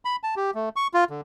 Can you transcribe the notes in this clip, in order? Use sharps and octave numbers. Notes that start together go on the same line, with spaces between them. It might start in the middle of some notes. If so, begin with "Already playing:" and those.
B5
A5
G4
A3
C#6
F4
D3